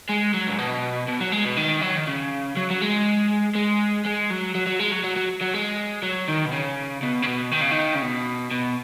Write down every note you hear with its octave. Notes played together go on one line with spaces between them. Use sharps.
G#3
F#3
G#2
B2
B2
F#3
G#3
B2
D#3
F#3
D#3
C#3
F#3
F#3
G#3
G#3
G#3
F#3
F#3
F#3
G#3
F#3
F#3
F#3
F#3
G#3
F#3
D#3
B2
C#3
B2
C#3
B2
D#3
C#3
D#3
C#3
B2
B2